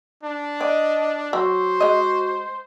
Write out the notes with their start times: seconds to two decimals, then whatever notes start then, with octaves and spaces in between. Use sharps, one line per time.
0.23 D4
0.61 B4 D5 D#5
1.33 F#3 F#4 C5
1.80 G#3 D#5